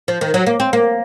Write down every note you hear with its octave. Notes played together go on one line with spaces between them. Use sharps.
F3
D#3
F#3
A#3
C4
A#3